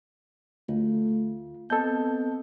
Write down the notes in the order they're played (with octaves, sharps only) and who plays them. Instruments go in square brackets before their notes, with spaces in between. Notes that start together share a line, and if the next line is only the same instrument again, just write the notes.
[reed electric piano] D2 [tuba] A3 [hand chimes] F4
[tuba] B3 [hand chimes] C4 D#5 A5 [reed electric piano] A4 G6